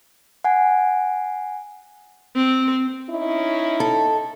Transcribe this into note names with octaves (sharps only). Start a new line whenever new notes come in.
F#5 G#5
C4
C#4 D#4 E4
A4